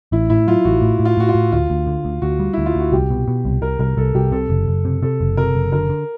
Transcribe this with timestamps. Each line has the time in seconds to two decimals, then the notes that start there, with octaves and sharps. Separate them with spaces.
0.12 A1 E4
0.30 A2 E4
0.47 F#3 F4
0.65 A1 F#4
0.82 A2
1.00 A2
1.05 F4
1.17 A2 F#4
1.29 F4
1.35 A2
1.52 D2 F4
1.70 D2
1.87 D3
2.05 D2
2.22 D2 F#4
2.39 G3
2.53 D2 E4
2.66 F4
2.75 D2 F#4
2.92 C2 G4
3.10 B2
3.28 B2
3.45 C2
3.62 C2 A#4
3.79 C2 A#4
3.97 C2 A4
4.15 C2 G4
4.32 C3 A4
4.50 F#1
4.68 F#1
4.85 C3
5.02 C3 A4
5.21 F#1
5.37 C3 A#4
5.55 F#1
5.72 D3 A#4
5.90 D3